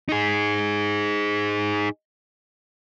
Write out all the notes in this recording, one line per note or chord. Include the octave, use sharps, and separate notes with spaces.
D#4 G#4